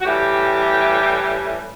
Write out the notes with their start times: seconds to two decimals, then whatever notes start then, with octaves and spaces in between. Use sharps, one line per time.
0.01 F#4
0.05 A2 E3 G3 G4